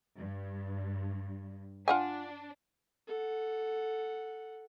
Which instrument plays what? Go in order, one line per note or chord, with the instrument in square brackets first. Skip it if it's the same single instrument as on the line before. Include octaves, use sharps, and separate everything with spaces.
[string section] G2
[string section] D4 [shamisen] F4 F#5 G#5
[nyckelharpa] A4 F#5